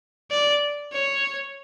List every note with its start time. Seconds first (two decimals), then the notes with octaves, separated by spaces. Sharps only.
0.31 D5
0.93 C#5